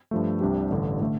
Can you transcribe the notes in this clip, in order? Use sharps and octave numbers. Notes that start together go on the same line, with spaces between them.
G2 F3 A3
C2 C3 G3 D4 G4
A1 G2 D3
D3 A3